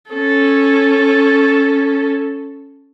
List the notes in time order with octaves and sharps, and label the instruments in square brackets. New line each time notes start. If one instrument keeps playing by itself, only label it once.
[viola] C#4 A4